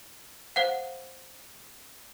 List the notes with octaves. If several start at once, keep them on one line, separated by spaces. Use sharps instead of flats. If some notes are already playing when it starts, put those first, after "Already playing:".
C5 F5 F#5